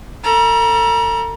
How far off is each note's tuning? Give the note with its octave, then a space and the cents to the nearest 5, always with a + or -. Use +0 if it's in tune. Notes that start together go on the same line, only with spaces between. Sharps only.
A4 +40 A#5 +35